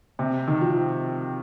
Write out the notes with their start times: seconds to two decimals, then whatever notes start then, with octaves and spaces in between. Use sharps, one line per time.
0.19 C3
0.48 D#3
0.61 F3